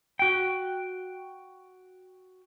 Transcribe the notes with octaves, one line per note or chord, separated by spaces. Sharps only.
F#4 G5